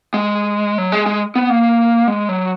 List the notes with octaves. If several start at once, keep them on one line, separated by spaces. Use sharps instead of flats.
G#3
F#3
G#3
G#3
B3
A#3
G#3
F#3